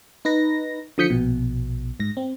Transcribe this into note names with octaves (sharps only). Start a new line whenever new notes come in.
D#4 B4 A#6
D3 F3 D#6 G6 B6 C#7
A#1 B2
G#2 A#6
C4